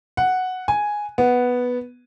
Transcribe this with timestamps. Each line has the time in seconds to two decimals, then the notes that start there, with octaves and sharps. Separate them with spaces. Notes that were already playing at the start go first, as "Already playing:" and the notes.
0.17 F#5
0.68 G#5
1.18 B3